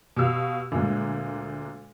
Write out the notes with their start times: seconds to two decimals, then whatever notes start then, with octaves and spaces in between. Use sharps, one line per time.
0.17 B2 G4 F5 E6
0.72 D2 A#2 G#3